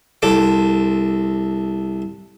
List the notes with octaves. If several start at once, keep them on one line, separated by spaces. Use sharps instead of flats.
C2 A4 D6